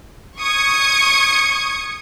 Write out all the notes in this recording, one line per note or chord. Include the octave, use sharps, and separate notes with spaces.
C#6 D#6 G#6 C#7